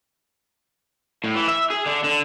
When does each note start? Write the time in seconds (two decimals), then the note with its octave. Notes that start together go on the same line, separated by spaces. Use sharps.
1.24 A2
1.36 E3
1.48 E5
1.70 G#4
1.86 D3
2.04 D3